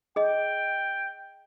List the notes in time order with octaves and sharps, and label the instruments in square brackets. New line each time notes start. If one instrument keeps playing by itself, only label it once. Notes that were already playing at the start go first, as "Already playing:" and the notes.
[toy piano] G#4 D#5 [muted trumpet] G5